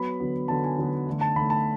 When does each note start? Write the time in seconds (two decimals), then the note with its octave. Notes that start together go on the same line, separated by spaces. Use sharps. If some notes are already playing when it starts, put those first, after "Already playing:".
Already playing: F#3 B3 B5
0.20 D3 F#3 B3
0.48 D3 F#3 B3 A5
0.64 G#5
0.78 D3 F#3 B3
1.06 D3 A3
1.21 A5
1.36 D3 A3 B5
1.50 A5